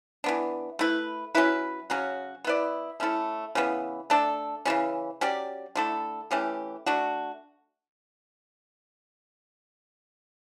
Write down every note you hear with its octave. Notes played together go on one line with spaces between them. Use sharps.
E3 B3 D4
A3 E4 B4
F#3 C#4 E4 B4
C#3 F#3 C#4 F#4
B3 E4 B4 D5
A3 C#4 E4 A4
C#3 E3 B3
A3 D4 A4
C#3 E3 G3 C#4
F#3 C#4 G4 D5
D3 A3 E4 A4
E3 A3 C#4 G4
A3 D4 F#4